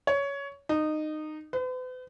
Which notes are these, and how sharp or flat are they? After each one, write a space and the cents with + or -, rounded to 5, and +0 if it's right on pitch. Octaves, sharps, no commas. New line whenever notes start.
C#5 +15
D#4 -20
B4 +45